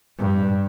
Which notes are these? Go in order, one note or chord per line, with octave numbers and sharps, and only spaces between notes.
G2